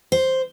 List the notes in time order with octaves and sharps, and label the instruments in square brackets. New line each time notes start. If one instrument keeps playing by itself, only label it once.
[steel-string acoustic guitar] C5